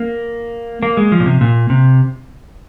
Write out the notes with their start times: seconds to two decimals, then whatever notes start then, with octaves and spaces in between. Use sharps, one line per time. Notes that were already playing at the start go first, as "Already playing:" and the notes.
Already playing: A#3
0.83 A#3
0.97 G#3
1.12 F3
1.20 A#2
1.26 C3
1.41 A#2
1.70 C3